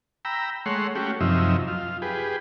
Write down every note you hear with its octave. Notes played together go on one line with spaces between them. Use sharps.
G5 A#5 B5 E6
G#3 A3 C#5 F#5 C6
A3 C#4 F#4 G4
F#2 C3 F3 D#4 E5
F4
G4 G#4 B4